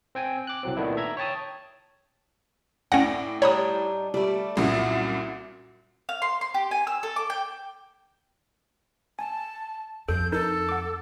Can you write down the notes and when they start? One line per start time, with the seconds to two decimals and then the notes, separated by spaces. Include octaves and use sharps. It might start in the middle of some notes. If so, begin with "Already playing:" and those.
0.15 C4 G5 G#5
0.47 D6 F#6
0.63 C2 F#3 C4
0.77 A#2 D#3 A3 B3 D4 E4
0.97 E5 A#5 G#6
1.17 C#5 G5 A5 D#6
2.92 A2 C#4 D4 F#5 G5 A#6
3.42 G3 D4 D#4 C#5 B5 D#6
4.14 G3 A3 D5
4.57 C2 F#2 A#2 E4 F#4
6.09 F5
6.22 C6
6.41 C6
6.54 G4
6.71 G#5
6.87 E6
7.03 A4
7.16 D6
7.30 G5
9.19 G#5 A5
10.09 F2 A4 G6
10.32 D#4 A4 A#4
10.69 F#5 D6